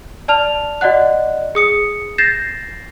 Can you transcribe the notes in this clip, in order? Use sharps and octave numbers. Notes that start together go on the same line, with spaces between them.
D5 A5 F6 F7
F#4 D5 D#5 F#5 F#6
G#4 D#6 C#7
G6 A6 A#6 C7 E7